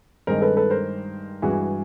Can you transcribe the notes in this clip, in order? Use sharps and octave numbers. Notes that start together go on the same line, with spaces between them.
G2 D#3 G#3 A#4 C5
A4 B4
A4 B4
A#4 C5
G2 E3 G#3 F#4 G#4